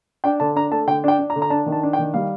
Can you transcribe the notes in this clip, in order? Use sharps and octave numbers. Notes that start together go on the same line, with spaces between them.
D4 G5
D3 A5
D4 A#5
A3 A5
D3 G5
D4 G5
D4
A#5
D3
A#5
D4 A5
D#3
A5
D4
G5
D#3
G3 F5